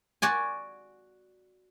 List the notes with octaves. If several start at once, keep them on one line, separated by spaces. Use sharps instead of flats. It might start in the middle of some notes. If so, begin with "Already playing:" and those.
F#4 D5 G#5